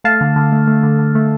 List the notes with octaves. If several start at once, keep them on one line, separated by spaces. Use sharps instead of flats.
A3 F5 A5
D3
D3
A3
A3
D3
D3
A3